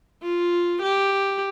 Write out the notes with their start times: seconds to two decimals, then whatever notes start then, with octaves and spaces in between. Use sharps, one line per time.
0.23 F4
0.82 G4